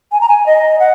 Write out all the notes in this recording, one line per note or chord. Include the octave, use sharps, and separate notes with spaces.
G#5
A#5
G#5
D#5
F#5